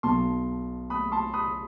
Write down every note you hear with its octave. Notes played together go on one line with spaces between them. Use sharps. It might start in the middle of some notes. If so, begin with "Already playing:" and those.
B1 B2 A5 C6
B5 D#6
A5 C6
B5 D#6